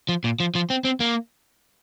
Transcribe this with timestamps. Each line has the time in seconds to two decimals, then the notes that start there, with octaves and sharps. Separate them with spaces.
0.09 F3
0.24 A#2
0.40 F3
0.55 F3
0.70 C4
0.85 C4
1.00 A#3